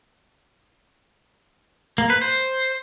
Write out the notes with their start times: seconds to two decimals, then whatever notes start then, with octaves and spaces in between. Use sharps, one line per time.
1.98 A#3
2.10 B4
2.21 C5